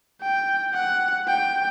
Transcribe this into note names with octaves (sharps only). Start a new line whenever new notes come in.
G5
F#5
G5